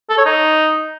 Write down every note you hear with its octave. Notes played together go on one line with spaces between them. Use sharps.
A4
C#5
D#4